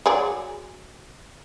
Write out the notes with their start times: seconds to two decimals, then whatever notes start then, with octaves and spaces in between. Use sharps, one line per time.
0.06 F#3 G#4 D5